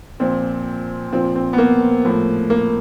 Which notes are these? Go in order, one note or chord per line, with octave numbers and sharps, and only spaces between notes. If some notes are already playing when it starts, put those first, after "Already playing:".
A#2 F3 C4
A#2 F3 C4
C4
B3
A#3
A2 F3
A#3